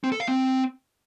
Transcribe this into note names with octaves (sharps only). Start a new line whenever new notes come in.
C4
A4
F5
C4